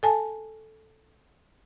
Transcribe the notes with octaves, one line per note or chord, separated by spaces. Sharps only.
A4 G#5 A5